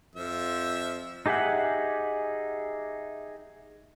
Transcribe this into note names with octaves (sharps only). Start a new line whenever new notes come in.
F2 F3 E5 E6
D#4 G4 G#4 E5 F#5